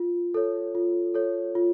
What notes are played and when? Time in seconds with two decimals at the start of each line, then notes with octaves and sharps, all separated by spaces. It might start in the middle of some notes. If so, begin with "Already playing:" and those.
Already playing: F4
0.34 A4 C#5
0.75 F4
1.15 A4 C#5
1.55 F4